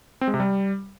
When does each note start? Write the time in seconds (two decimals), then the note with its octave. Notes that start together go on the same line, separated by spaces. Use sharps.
0.21 C4
0.28 G#3
0.34 C3
0.40 G3